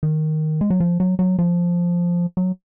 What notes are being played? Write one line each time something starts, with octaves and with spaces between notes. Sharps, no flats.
D#3
G#3
F#3
F3
F#3
F#3
F3
F#3